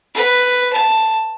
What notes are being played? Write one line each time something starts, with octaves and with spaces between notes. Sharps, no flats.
B4
A5